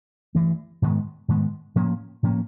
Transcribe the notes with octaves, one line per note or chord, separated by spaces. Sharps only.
G2 E3 A3
G#2 D#3 G#3 B3
G#2 D#3 G#3 B3
A2 F3 A#3 C#4
A2 F3 A#3 C#4